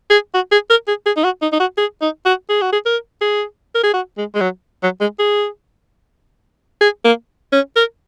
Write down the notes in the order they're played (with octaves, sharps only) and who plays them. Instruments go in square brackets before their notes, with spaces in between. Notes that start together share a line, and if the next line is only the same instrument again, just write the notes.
[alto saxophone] G#4
F#4
G#4
A#4
G#4
G#4
D#4
F#4
D#4
D#4
F#4
G#4
D#4
F#4
G#4
F#4
G#4
A#4
G#4
A#4
G#4
F#4
G#3
G#3
F#3
F#3
G#3
G#4
G#4
A#3
C#4
A#4